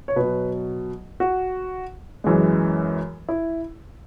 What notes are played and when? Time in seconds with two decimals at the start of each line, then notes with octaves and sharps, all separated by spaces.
0.08 C#5
0.16 B2 F#3 B4
1.20 F#4
2.24 F#2 E3 G#3
3.29 E4